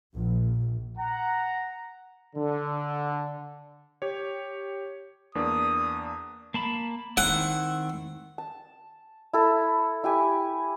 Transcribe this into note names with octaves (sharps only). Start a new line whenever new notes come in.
A#1
F#5 A#5
D3
G4 C#5
E2 A#3 D4 D#6
A#3 A5 B5
D#3 C4 E4 F#5
A5
E4 A4
E4 G4 G#5